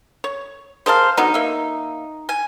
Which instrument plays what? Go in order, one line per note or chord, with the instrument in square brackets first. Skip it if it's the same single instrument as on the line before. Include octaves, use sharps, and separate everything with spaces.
[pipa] C#5
[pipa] G#4 A#4 A5 [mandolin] C5 F5
[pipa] D3 F#3 B3 [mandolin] D#4
[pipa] A#3 E5
[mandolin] G#5